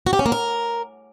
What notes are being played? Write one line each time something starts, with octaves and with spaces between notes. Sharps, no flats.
F#4
G4
C#4
A#3
A#4